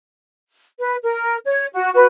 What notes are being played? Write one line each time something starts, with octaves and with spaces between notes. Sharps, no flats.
B4
A#4
C#5
F#4
F#4 B4